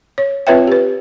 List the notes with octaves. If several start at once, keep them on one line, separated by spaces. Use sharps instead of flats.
C#5
C4 F4 B4 C#5 E5 G5
G4 B4